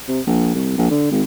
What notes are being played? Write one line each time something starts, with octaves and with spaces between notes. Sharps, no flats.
C3
A#1
C2
A#1
D3
G#1